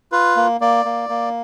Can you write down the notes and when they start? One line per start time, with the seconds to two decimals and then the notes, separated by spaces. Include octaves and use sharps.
0.12 F4 B4
0.36 A#3
0.61 A#3 D5
0.85 A#3
1.09 A#3